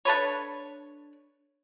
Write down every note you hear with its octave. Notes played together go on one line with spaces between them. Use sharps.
D4 A4 B4 C#5